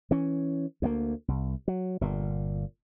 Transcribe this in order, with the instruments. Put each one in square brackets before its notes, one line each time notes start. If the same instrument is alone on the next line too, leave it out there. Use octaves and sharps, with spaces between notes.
[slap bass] E3 C#4
D2 G3 A#3
C2
F#3
G1 A#2